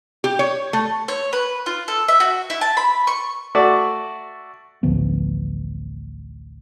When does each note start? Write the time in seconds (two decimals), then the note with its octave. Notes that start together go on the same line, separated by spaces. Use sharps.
0.24 G4
0.39 C#5
0.73 A3
1.08 C#5
1.33 B4
1.66 F4
1.88 A4
2.08 E5
2.20 F#4
2.50 E4
2.61 A5
2.77 B5
3.07 C#6
3.55 A3 F#4 D5
4.83 A1 D2 F3 B3